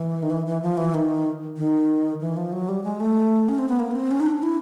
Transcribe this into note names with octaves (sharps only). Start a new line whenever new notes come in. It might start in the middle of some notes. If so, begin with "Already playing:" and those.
Already playing: E3
D#3
E3
E3
F3
E3
D#3
D#3
E3
F3
F#3
G3
G#3
A3
C#4
C4
B3
A#3
B3
C4
C#4
D#4
D4
E4